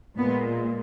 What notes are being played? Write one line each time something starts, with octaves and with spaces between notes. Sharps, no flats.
A#2 G#3 B3